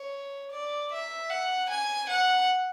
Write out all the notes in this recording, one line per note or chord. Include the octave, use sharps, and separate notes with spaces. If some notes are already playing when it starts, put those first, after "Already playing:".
Already playing: C#5
D5
E5
F#5
G#5
F#5